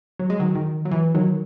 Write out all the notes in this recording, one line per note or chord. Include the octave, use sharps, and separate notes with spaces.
F#3
G#3
D#3 F#3
D#3
F#3
E3
D#3 F#3